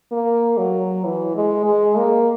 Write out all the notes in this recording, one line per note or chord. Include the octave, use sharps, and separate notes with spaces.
A#3
F#3
E3
G#3
G#3
A#3